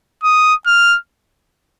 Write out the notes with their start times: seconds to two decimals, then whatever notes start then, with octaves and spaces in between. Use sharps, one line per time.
0.24 D#6
0.67 F6